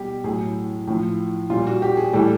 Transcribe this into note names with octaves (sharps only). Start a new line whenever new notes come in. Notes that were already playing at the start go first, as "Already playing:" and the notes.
Already playing: B2 G3 G4
A2 F#3 G#4
A2 F3
A#2 G3 F4
F#4
G4
G#4
A2 E3 G3 A4